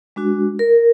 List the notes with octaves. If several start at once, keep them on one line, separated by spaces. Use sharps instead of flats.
G#3 D4 F#4
A#4